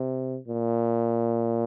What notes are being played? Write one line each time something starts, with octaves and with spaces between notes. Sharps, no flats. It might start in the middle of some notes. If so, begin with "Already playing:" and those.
Already playing: C3
A#2